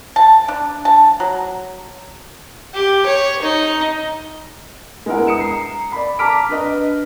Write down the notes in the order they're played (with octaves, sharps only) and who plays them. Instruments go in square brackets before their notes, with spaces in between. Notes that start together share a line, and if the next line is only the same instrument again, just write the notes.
[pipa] A5
D4
A5
F#3
[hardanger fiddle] G4
C#5
D#4
[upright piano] G#3 B3 E4 A#4 F#5
D#6 C#7 E7
A#5 C7
D5 B5
A5 A#5 D6 F6 B6 D7
D4 B4 D#5